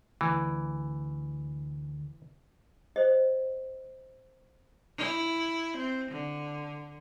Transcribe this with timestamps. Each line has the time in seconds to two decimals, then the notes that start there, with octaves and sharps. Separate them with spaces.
0.21 D2 E3
2.96 C5 D#5
4.98 E4
5.77 C4
6.11 D3